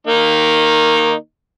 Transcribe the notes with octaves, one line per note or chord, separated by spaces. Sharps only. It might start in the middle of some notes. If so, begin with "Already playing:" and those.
D#3 A#3 D#4